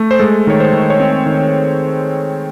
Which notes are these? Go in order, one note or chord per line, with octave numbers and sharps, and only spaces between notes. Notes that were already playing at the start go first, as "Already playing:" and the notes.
Already playing: A3
C5
G#3 A4
D#3 C#5
C5
D#3
C#5
C4 C5
D#3